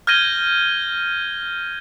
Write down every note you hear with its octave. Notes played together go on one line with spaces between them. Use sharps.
F6 G6 G#6 A#6 D#7 G7